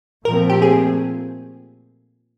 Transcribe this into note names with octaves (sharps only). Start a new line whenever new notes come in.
A#2 F3 A3 C4 A#4
G4
G#4